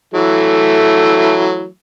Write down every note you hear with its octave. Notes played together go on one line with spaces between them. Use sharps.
E3 F#3 A3